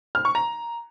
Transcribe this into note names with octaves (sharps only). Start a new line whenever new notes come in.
F6
C#6
A#5